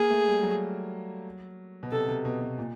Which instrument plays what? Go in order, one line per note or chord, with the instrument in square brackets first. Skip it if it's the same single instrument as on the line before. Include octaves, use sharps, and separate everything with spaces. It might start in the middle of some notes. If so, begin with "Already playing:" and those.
Already playing: [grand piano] A#3 [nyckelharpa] G#4
[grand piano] A3
G3
F#3
B2
[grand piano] C3 [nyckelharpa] A4
[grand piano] C3
B2
B2
A#2